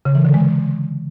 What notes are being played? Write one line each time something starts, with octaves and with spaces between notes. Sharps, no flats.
C#3
E3
D3
G#3